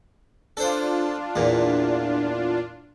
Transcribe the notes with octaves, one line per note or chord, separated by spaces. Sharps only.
D4 F4 A4 C5
E2 A#2